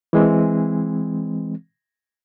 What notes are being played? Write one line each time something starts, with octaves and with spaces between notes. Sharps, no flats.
E3 G#3 C4